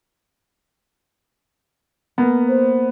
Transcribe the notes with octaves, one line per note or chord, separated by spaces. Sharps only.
A#3 B3
C5